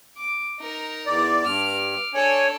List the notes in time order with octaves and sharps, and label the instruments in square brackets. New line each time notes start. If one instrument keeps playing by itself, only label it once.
[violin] D6
D#4 A#4
[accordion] E2 D5
[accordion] G2 [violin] D6 F6
[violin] D4 A4 [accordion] C#5 G#5